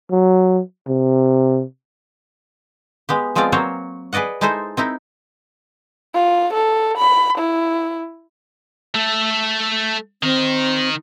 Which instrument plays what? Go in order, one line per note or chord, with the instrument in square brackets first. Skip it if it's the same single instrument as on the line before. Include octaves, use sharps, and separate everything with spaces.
[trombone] F#3
C3
[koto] G#3 B3 G4
F3 G#3 B3 C4 F4 D5
F#3 A#3 C4 C5 C#5
G#4 B4 D5 D#5 F#5
G#3 D#4 E4 A4 C5 G#5
C4 D#4 E4 A#4
[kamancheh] F4
A4
B5
E4
[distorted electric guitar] A3 A4
[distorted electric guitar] D#3 D#4 [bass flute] C4